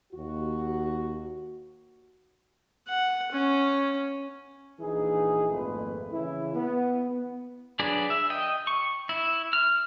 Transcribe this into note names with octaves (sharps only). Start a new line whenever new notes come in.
D#2 F#4
F#5
C#4
A#1 E3 D#4 G#4
G#1 F2 A#2 A3 B4
C#3 E3 E4
B3
F#3 D4 G#4 B4 D5
E5
D#5 G5
C#6
E4
F6